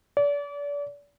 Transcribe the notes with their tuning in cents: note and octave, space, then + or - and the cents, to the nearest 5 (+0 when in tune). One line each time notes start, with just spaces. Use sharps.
D5 -35